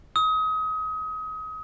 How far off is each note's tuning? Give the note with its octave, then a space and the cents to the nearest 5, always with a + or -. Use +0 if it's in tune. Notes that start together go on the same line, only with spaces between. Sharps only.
D#6 +30